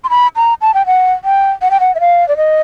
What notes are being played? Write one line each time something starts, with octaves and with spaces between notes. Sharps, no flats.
C6
B5
A#5
A5
G5
F#5
G5
F#5
G5
F#5
E5
F5
D5
D#5